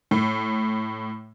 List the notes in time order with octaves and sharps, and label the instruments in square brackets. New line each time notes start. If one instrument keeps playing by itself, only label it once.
[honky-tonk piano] A2